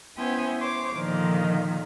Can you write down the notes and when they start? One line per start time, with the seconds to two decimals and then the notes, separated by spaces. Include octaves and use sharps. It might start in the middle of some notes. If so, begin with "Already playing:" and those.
0.17 B3 C#4 E4 C5 G5 G#5
0.59 C5 C#5 D6
0.94 A#2 D3 D#3 F3